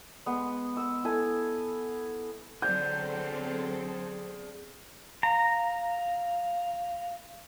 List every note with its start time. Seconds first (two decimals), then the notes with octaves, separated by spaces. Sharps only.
0.26 G#3 B3
0.77 E6
1.04 E4 A4 G#5
2.62 D3 F#3 C4 G#4 A4 C5 D5 G6
5.23 F5 A#5